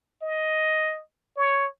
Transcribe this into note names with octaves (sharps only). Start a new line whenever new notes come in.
D#5
C#5